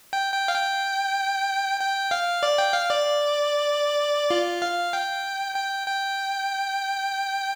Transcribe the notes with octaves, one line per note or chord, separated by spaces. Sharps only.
G5
G5
F5
G5
G5
F5
D5
G5
F5
D5
F4
F5
G5
G5
G5